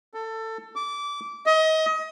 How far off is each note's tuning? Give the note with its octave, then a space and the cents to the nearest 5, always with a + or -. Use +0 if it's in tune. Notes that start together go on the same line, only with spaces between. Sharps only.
A4 +20
D6 -20
D#5 +30